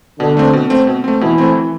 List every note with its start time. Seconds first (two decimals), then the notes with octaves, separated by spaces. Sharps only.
0.19 B2 D3 D4
0.37 A3 C4
0.53 B2
0.70 A3 C4
0.87 B2
1.04 A3 C4
1.21 B2 E3 E4
1.38 A3 C4
1.55 E3